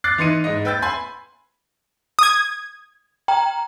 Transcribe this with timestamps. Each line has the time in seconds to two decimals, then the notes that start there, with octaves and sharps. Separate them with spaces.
0.04 D6 F#6 A6 C7
0.18 E3 D#4 C6 C#7 D#7
0.44 G#2 D#5
0.65 B4 G5 E6 G6 A6
0.82 G#5 B5 C6
2.19 D#6 G#6
3.28 G5 A#5